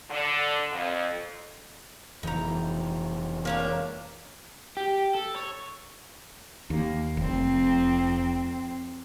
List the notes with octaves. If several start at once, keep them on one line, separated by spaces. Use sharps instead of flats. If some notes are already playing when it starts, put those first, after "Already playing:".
D3
F2
F1 E3 D#4 A#5
A#3 C#4 D4
G4
A4
C#5
D#2 A#3
F1 F2 C4